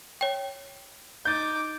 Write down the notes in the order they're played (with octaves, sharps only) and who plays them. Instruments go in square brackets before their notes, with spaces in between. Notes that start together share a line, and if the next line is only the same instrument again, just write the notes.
[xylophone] C#5 G5
[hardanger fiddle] D#4 D6 [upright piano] G6 A6